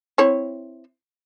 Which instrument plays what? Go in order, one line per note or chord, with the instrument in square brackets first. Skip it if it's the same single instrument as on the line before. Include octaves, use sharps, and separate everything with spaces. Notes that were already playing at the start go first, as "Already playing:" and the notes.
[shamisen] C4 E4 C#5